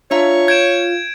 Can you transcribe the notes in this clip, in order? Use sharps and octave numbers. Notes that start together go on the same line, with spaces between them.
D4 F4 C#5 E5 A#5
G6 G#6 D7 E7